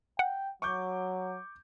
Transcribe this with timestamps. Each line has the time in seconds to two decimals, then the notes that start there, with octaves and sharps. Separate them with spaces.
0.19 F#5 G5
0.62 F#3 C#6 D6 G6